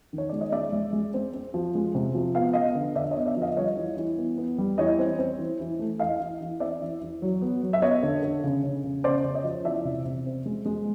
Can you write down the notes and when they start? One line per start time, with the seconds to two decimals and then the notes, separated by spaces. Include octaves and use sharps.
0.13 D#3
0.18 C#5
0.29 G#3 D5
0.41 D#5
0.52 G#3 D5 E5
0.73 G#3
0.93 G#3
1.14 C4
1.34 C4
1.54 F3
1.75 G#3
1.95 C3
2.15 F3
2.35 B3 F5
2.53 B3 D#5 F5
2.75 D3
2.95 D3 D5 E5
3.11 C#5 D#5
3.16 B3
3.26 D5 E5
3.36 F3
3.42 D#5 F5
3.57 G3 C#5 D#5
3.77 E3
3.97 E3
4.18 B3
4.38 B3
4.58 G3
4.78 E3 C#5 D#5
4.99 C4
5.19 C4
5.39 E3
5.60 E3
5.79 A3
5.99 E3 D#5 F5
6.20 E3
6.41 E3
6.60 C4 D5 E5
6.82 E3
7.02 E3
7.22 F#3
7.41 B3
7.63 F#3
7.73 E5
7.82 B3 C#5 D#5
8.03 D3
8.23 D3
8.44 C#3
8.63 C#3
8.84 C#3
9.04 C#3 C5 D5
9.24 C#3
9.34 C#5 D#5
9.44 F3
9.64 E3 D5 E5
9.85 C3
10.06 C3
10.26 C4
10.46 G#3
10.66 G#3